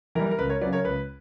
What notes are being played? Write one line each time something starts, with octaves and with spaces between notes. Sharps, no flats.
E3 G3 A#4
A#4
C#2 B4
A#4 C#5
C#3 F#3 B4 D5
A#4 C#5
C#2 B4